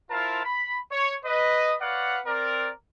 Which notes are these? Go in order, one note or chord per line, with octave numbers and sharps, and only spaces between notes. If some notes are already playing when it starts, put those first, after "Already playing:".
E4 F4 A#4 C5 F5 A5
B5
C#5
B4 D#5
B4 C#5 D5 F5 F#5
C4 A#4 D5